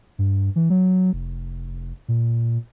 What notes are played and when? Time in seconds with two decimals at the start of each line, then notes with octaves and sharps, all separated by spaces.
0.18 G2
0.56 E3
0.70 F#3
1.13 F1
2.08 A#2